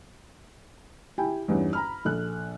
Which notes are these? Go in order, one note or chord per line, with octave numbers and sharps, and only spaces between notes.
E4 G4 G5 G#5
E2 G2 C#4 D#4
A#5 B5 F6
A#1 A4 F#6